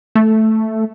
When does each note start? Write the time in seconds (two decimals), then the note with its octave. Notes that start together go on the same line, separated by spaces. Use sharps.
0.15 A3